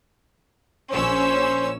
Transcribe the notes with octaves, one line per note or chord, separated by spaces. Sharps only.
A#1 C#4 C5 E6